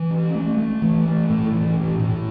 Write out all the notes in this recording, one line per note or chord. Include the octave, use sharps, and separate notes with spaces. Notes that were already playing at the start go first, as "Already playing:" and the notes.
Already playing: E3
C#4
A3
A3
E3
A3
A2
E3
A2
A2